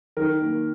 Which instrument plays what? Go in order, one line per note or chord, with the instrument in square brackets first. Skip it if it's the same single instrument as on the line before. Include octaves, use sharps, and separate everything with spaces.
[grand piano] D#3 A#4
A#3